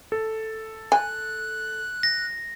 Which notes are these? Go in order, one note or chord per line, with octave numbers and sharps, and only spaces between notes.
A4
G#5 F#6
A#6